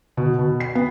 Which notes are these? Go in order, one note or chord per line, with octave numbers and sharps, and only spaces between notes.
B2
B2
C7
B3